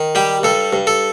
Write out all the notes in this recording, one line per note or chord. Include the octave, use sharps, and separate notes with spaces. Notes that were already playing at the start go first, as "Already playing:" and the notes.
Already playing: D#3
G3 G4
G2 A4
G2
A4